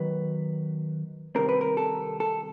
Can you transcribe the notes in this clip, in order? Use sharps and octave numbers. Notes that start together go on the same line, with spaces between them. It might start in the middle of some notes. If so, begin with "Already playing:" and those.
Already playing: D#3 F#3 B3 B4
C3 D#3 G3 C4 A#4
B4
A#4
A4
A4